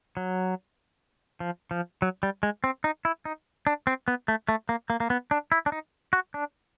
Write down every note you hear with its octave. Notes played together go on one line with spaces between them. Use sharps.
F#3
F3
F3
F#3
G3
G#3
C4
D#4
E4
D#4
D4
C4
B3
A3
A3
A#3
A#3
A#3
B3
D4
E4
D4
D#4
F#4
D4